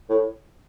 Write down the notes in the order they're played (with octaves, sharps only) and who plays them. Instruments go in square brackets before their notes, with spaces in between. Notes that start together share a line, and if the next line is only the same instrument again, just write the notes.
[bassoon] A2